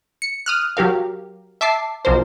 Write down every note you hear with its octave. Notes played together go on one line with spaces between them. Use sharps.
C#7
D#6 F6 F#6
F#3 G4 A#4 F5
E5 A5 D6 C7
B1 F3 A#4 C5